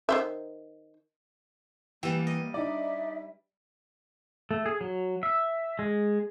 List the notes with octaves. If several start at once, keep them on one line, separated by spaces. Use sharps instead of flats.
D#3 C5 E5
E3 G3 A#3 B3 G4
D#5
D4 D#4 D5 E5
A3
G#4
F#3
E5
G#3